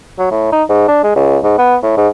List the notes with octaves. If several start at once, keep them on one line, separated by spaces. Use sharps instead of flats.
F#3
A2
D#4
G#2
D4
G#3
C#2
G#2
B3
A2
G#2